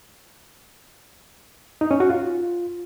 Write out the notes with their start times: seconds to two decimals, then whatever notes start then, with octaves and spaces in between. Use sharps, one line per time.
1.81 D#4
1.91 C#4
2.00 F#4
2.10 F4